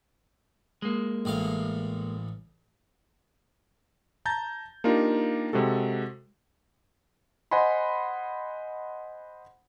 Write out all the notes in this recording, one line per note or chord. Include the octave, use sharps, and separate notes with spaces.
G#3 A#3
A1 A2 F5
A5 A#5 G6 A6
A#3 D4 D#4 F4 G4 A#4
C3 G#3 F#4 A4
C5 D#5 F#5 G#5 B5 C6